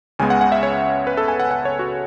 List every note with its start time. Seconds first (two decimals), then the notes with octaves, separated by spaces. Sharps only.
0.19 C#2 C#3 G#3 B3 G#5
0.30 F#5
0.41 F#5
0.52 E5
0.63 C#5
1.07 B4
1.17 A4
1.28 G#5
1.40 F#5
1.51 F#5
1.65 C#5
1.79 F#4